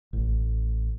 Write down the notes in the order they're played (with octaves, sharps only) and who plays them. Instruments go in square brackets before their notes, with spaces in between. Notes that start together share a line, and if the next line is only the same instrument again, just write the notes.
[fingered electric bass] A1